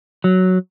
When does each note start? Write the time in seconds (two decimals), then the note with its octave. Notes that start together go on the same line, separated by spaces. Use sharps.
0.24 F#3